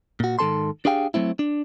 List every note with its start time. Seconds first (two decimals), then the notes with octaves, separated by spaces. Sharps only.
0.20 A#2 F#4
0.39 G#2 D#3 C#4 A4 A5 C6
0.85 D4 G4 G#4 F5 G5
1.14 F#3 A3 C4 E4
1.39 D4